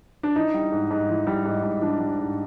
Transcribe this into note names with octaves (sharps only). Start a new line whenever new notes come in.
D4
E3 D#4
G3
G#2
G#2
E3
G3
G#2
G#2
E3 D4
G3
G#2